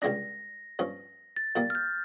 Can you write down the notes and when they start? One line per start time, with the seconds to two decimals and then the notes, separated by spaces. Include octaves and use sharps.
0.02 C#2 C#3 G3 D4 A#6
0.79 G2 F3 C#4
1.37 A6
1.56 A#2 G3 A#3 A6
1.70 F6
1.75 G6